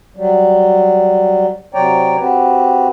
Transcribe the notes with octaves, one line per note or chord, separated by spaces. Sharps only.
F#3 G3
C3 F#3 C#5 D5 G5 A#5
C4 F#4 G4 B4